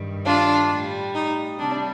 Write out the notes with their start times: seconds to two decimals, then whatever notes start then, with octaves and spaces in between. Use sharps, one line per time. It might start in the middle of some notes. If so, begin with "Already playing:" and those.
Already playing: G2 D#3 G3
0.25 D4 F4
0.70 A2 G3
1.13 D#4
1.58 C3 G3 D4